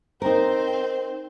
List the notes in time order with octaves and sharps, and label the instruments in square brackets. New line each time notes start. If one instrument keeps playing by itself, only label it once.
[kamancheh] C4 C5 [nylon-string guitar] D#4 A#4